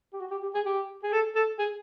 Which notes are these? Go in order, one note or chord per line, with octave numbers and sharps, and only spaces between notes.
G4
F#4
G4
G4
G#4
G4
G#4
A4
A4
G#4